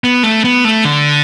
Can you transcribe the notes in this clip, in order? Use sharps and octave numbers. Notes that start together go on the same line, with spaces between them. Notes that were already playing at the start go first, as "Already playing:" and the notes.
B3
A3
B3
A3
D3